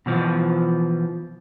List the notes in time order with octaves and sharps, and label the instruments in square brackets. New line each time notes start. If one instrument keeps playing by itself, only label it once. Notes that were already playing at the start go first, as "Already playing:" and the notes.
[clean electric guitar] B2 E3 F3